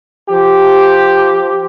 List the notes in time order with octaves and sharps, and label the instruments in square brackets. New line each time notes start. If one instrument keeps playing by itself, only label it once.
[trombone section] F3 G4